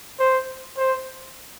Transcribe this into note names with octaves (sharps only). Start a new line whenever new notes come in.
C5
C5